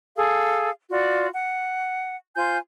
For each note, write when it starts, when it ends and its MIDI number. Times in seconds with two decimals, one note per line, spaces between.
0.16 0.70 68
0.16 0.70 69
0.16 0.70 77
0.90 1.27 65
0.90 1.27 66
0.90 1.27 74
1.33 2.16 78
2.36 2.57 65
2.36 2.57 72
2.36 2.57 80
2.36 2.57 91